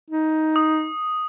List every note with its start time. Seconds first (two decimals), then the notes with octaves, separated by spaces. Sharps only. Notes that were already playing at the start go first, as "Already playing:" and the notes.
0.10 D#4
0.56 D#6